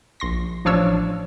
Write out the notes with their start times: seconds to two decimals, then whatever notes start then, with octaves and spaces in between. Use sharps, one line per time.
0.20 A#1 C6 A#6
0.65 A1 F3 D4 C#5 E6